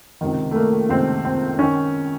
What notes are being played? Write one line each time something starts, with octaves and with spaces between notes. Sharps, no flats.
C#2 C3 D#3
A3
A#3
C#2 C3 D#3 C4
C4
D#3 C#4